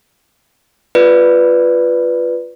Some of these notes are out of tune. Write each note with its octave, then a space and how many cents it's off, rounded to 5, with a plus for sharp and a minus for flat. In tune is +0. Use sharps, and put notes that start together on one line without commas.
F4 +0 B4 +0 D5 +0